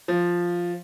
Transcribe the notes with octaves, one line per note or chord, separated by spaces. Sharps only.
F3